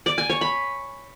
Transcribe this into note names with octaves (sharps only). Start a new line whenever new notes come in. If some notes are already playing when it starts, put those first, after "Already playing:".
D5
G#5
C#5
B5